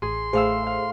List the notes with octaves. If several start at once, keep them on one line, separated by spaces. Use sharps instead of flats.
A1 G#4 C6
A1 A2 G#4 C5 F5 E6
F5